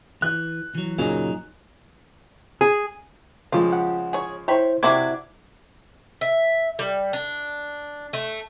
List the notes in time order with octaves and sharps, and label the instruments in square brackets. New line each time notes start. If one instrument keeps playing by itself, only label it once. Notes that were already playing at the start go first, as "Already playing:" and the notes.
[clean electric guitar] E3 [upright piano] F#6
[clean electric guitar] E3 F#3
[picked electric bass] F#2 A#2 C#3 [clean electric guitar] F#3 D#4 G#4
[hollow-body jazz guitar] G#4
[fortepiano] C#3 F3 G#3 [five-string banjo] F4 G4
[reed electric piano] F#5
[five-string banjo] G#4 C#5
[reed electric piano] E4 C5 [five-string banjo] C#5 G5 B5
[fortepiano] C3 [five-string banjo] C4 D4 F#4 [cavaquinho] E4 D6 [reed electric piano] G#6
[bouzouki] E5
G3
D4
A3